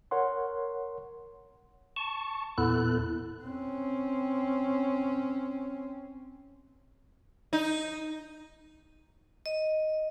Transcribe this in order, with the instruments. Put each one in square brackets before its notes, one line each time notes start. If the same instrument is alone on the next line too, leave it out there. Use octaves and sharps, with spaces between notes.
[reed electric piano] A#4 C#5 F#5 C6
[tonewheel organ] A5 C#6
E2 A#2 B3 E4 A4 F#6
[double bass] C4 C#4
[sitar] D#4
[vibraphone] D#5